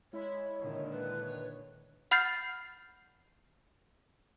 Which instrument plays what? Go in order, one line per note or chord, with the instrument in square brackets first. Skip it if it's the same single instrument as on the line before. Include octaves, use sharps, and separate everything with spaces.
[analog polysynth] G#3 E4 E5 [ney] C#5
[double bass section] A#2 D3 D#3
[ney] B4
[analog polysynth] C#5
[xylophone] F#5 B5 F6 G6 A6 C7